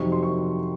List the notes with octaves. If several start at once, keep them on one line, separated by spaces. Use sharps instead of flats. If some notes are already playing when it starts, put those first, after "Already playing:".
Already playing: F2 C3 D#3 F#3 C#6
C6
C#6